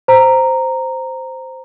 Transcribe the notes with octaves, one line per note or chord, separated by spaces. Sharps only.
C5 A#5